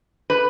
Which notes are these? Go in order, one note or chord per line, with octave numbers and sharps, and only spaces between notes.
B4